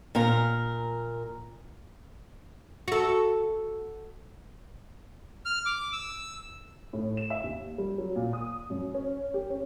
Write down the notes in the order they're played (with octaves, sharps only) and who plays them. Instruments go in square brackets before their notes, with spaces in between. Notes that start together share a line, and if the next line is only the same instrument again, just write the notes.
[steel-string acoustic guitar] A#2 A#4 A#5
[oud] F#4 A4
[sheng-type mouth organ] F6
D6
E6
[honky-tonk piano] A2
E7
E5
D#2
G3
F#3
A#2
D#6
F#2
C#4
G4
C#4